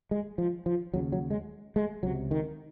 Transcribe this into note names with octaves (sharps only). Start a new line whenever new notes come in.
G#3
F3
F3
D#2 C#3 F#3
F#3
G#3
G#3
C#2 C3 F#3
D#3